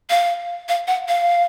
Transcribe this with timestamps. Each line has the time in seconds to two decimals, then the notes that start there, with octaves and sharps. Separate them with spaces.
0.10 F5
0.69 F5
0.88 F#5
1.08 F5